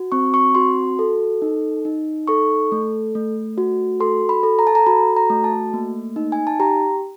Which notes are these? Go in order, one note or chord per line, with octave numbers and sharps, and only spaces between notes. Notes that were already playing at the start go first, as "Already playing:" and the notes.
Already playing: F#4
C4 C#6
C#6
F#4 C6
A4
D#4
D#4
A4 C#6
A3
A3
F#4
A4 C6
B5
A4
A#5
A5
A#5
F#4 B5
A#5
A3
A5
A#3
D#4
G#5
A5
G4 A#5